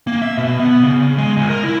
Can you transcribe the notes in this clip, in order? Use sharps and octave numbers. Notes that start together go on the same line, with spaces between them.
A#3
E5
B2
B3
C#3
C#3
G#3
C#2
A#4
E4